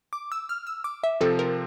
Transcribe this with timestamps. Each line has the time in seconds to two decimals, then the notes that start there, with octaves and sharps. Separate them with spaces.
0.13 D6
0.32 E6
0.49 F6
0.67 E6
0.84 D6
1.04 E5
1.20 C3 F3 C4 A4
1.39 A#4